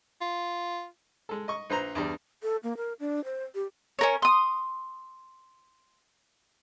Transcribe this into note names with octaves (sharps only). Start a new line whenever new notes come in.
F4
G#3 A4
D#5 C#6
A#1 B4 C5 A#5
E2 G2 G3
A4
A#3
A#4
D4
C5
G4
C#4 A#4 C#5
C6 D#6